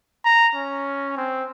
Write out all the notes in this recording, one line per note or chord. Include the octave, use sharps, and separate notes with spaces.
A#5
C#4
C4